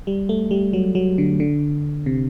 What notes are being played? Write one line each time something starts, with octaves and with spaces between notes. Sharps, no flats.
G3
A3
G3
F#3
F#3
D3
D3
C3